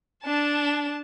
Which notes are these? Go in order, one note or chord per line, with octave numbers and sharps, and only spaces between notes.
D4 A5